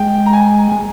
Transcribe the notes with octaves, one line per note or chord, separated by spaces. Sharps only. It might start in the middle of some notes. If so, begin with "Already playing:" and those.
Already playing: G#3 G5
A#5
G#5
G#3 G#5